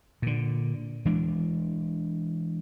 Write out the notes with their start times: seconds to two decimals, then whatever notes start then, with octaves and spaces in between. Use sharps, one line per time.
0.22 A#2 D3
1.05 E3 G#3 D4